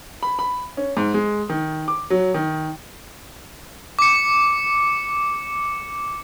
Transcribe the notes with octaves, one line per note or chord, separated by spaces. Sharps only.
B5
B5
C#4
G#2
G#3
D#3
D6
F#3
D#3
D6 C#7